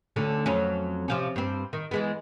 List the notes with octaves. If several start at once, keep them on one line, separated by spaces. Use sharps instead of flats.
D2 D3 C#4
F2 F#3 C#4
C3 F3 C#4
G2 C4
D#3
E3 G#3 B3